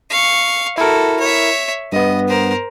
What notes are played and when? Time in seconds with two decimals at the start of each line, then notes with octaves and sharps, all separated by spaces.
0.10 F5 C#6
0.78 E4 F#4 A4 A#4
1.20 C#5 E5
1.92 G2 B3 D#5
2.28 A#4 C5